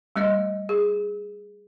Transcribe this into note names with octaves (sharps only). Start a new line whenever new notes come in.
G3 A3 D#5
G#4